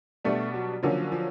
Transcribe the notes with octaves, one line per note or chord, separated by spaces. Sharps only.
B2 G3 A3 B3 D4
F#3
D3 F3 F#3 A#3 C#4
F3